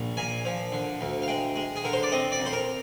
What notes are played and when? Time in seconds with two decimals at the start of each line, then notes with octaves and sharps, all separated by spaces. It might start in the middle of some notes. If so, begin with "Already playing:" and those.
Already playing: A#1
0.17 A#2 G#5
0.45 F3
0.72 D3
1.01 D2
1.22 F5
1.28 G#3 G5
1.56 G#3
1.76 G#4
1.84 D3 A#4
1.93 C5
2.03 D5
2.12 C4 D#5
2.32 D5
2.39 F2
2.46 C5
2.53 A#4